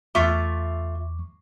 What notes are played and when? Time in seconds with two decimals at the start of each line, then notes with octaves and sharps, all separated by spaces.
0.15 E2 A3 F4 E5 C#6 D6